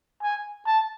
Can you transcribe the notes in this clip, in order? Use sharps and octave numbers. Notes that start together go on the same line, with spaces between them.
G#5
A5